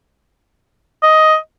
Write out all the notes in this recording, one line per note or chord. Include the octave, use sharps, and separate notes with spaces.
D#5